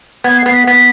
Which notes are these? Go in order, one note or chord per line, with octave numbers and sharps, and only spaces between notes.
B3 G#6
C7
B3
B6
B3 B6